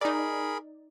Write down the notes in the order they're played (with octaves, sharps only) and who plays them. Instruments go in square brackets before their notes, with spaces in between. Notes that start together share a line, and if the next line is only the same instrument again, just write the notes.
[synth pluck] D#4 D5 [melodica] G#4 A#4 B5